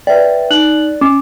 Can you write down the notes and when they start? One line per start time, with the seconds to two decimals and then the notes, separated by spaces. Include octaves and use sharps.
0.07 B4 D5 E5 G5
0.50 D#4 F#6 F#7
1.01 C#4 D6